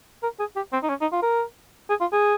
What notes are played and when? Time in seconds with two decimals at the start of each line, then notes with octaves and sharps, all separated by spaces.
0.23 A#4
0.39 G#4
0.56 G4
0.73 C4
0.83 D#4
0.89 C#4
1.01 D#4
1.12 F4
1.22 A#4
1.90 G#4
2.01 F4
2.12 G#4